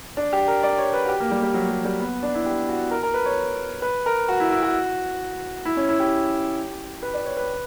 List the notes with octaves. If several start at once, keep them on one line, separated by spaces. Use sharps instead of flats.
D4
G4
A#4
D5
C#5
B4
F#4
G4
A#3
G3
G3
F#3
G3
G3
B3
D4
E4
G4
F#4
A#4
A#4
B4
C#5
B4
A#4
F#4
E4
E4
F#4
E4
C#4
E4
G4
B4
D5
C#5
B4